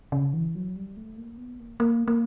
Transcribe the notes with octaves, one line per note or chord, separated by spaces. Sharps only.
C#3
E3
F#3
G3
A3
A#3
B3
A#3
A#3
A#3